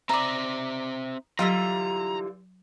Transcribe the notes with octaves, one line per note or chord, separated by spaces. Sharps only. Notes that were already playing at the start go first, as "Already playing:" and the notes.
C4 D#4 D5 E5 A#5
D3 E3 F#3 G3 F4 E5 A#5